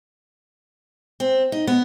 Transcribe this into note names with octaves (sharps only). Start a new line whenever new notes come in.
C4
D#4
B3